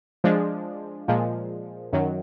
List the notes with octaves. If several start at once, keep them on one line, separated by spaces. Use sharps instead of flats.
F3 G#3 D4
A#2 F3 G#3
F#2 D#3 F#3